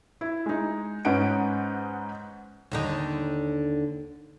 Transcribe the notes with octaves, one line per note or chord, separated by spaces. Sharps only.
E4
G#3 D#4
G#2 C#4 D#4 B4 F#5 D7
D#2 D3 D#4